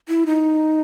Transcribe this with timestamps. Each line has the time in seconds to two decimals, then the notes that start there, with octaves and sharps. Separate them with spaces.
0.09 E4
0.26 D#4